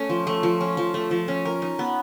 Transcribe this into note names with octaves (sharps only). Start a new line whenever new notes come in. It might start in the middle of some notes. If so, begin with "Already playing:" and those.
Already playing: A3 C#4
F3
A3
F3
C#4
F3
A3
F3
C#4
A#4
D#4
B3